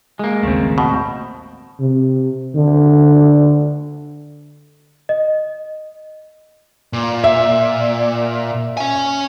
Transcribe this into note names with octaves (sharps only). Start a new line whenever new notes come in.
G#3 A#3
A1 D#2 C#3 A3 C4
B2
C3
D3
D#5
A#2
E5
C#4 G#5